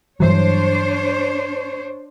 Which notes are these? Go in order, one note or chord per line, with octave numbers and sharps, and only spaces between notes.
G2 E3 F#3 D4 C5 C#5